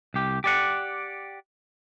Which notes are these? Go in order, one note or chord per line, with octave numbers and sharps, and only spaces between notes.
C2 G4
G4 D5 F#5